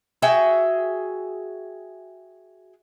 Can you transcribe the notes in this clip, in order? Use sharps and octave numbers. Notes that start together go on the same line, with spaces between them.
F#4 G#4 E5 G5